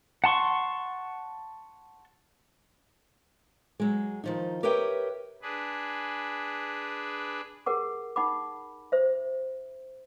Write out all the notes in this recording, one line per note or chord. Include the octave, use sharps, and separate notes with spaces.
F#5 A5 C6 C#6
F#3 G#3
D#3 F3 D#4
G4 A#4 B4 C#5 E5 G5
D4 G#4 B4
G4 G#4 A#4 F#5 D6
D#4 F#5 B5 D6
C5 E5